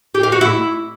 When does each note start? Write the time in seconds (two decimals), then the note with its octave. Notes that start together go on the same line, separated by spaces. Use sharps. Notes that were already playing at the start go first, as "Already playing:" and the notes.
0.15 G4
0.23 F5
0.32 F#4
0.41 E4